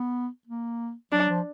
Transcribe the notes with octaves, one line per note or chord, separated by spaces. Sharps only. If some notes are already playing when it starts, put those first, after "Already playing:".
Already playing: B3
A#3
F#3 D4
F3